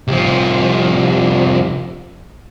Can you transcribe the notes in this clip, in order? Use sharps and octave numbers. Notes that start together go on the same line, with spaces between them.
C2 F3